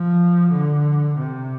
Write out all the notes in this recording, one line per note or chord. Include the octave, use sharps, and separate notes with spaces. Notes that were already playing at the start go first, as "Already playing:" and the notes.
Already playing: F3
D3
C3